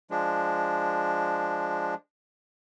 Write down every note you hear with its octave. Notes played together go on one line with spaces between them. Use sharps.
F3 G#3 D4